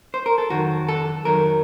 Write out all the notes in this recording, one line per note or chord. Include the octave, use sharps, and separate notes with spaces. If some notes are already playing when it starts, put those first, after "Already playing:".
C5
A#4
A4
F2 D#3 F#3 F#4
A4
F2 D#3 F#3 A#4